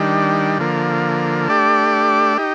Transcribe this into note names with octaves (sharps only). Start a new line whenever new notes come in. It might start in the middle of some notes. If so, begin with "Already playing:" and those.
Already playing: D#3 G3 D4
D3 F3 A#3
A3 D4 G4 D5
D#4 G4